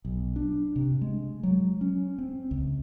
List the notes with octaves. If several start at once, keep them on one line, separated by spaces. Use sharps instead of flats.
B1
D4
C3
G#3
F#3
C#4
C4
C#2